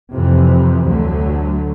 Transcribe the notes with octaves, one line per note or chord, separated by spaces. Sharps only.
F2 C3 E3
D2 D3 F#3 A3